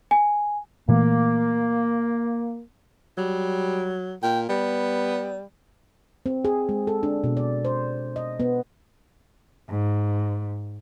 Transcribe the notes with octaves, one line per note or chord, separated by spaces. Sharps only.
G#5
A#2 E3 A3 A#3
F#3 G3
A#2 G5
G3 B3
C4
G#4
G#3
A4
D4
B2
D5
C5
D#5
B3
G#2